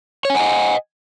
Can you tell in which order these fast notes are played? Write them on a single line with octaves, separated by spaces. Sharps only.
C#5 G#5 F#5 D#5